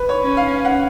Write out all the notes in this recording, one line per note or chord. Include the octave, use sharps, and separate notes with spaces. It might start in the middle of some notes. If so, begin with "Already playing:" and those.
Already playing: B4
C#5
C#4
F5
F#5